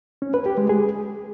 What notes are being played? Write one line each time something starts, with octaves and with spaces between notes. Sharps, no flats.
C#4
B4
G4
G#3
G#4